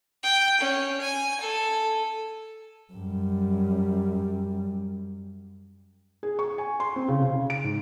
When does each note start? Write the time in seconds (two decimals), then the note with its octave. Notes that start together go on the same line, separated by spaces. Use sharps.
0.23 G5
0.60 C#4
1.01 G#5
1.41 A4
2.93 F#2 G3
6.23 G#4
6.39 C#6
6.58 G#5
6.80 C6
6.96 C4
7.08 C#3
7.22 C#3
7.50 D7
7.64 G#2